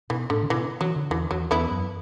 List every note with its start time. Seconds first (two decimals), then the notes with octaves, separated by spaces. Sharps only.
0.10 B2 E3
0.30 A2 D3
0.43 D3
0.50 B2 E3
0.81 E3 F#3
0.96 D3
1.10 E2 E3
1.31 E2 F#3
1.51 E2 B3 E4
1.71 F#2